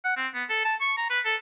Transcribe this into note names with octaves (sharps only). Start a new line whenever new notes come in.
F#5
C4
B3
A4
A5
C#6
A#5
B4
A4